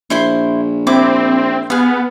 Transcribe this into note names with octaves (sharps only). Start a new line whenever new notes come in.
A#1 E4 C5 C6
C4 E4 D6
B3 G#4 F5